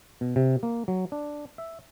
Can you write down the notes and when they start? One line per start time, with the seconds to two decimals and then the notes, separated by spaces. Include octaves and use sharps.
0.21 B2
0.36 C3
0.63 A#3
0.88 F#3
1.12 D4
1.58 E5